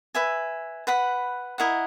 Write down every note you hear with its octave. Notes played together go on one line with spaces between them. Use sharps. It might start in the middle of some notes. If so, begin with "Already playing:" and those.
B4 E5 G#5
B4 F#5 B5
E4 A#4 D#5 F#5